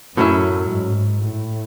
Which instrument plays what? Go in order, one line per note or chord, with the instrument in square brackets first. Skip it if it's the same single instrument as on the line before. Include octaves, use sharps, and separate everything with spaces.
[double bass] F#2 [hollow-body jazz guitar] A2 F#3 C#4 E4
[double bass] G#2
A2